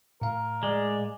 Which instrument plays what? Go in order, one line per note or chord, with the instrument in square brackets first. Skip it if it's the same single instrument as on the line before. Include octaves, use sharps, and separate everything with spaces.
[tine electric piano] A2 F5 [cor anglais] A#4
[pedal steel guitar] G#3 [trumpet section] D5